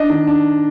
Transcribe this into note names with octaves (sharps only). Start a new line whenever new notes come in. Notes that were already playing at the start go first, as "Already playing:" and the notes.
Already playing: D4 D#5
D#3
D4